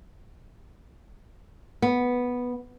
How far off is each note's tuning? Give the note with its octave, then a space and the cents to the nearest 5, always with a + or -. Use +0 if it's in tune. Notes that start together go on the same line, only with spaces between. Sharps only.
B3 -5